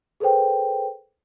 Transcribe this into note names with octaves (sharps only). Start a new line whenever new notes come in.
G#4 A4 B4 C5 G5